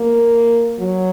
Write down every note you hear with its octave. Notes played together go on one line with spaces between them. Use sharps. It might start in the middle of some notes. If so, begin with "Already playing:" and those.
Already playing: A#3
F#3